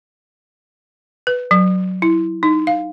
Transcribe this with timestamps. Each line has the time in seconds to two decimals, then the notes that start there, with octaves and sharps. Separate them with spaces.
1.27 B4
1.51 F#3
2.02 E4
2.43 D#4
2.67 F5